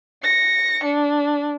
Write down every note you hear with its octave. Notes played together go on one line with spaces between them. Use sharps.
A#6 C#7
D4